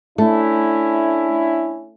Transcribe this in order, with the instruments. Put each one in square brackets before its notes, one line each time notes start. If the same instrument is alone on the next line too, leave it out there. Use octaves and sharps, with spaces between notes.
[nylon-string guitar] A3 [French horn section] C#4 D4 E4